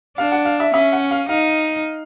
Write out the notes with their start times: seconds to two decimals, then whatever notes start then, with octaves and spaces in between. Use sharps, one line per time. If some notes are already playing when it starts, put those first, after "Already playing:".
0.18 D4 F5
0.32 F#5
0.45 F5
0.60 E5
0.74 C#4 E5
0.93 F#5
1.11 F5
1.29 D#4 F5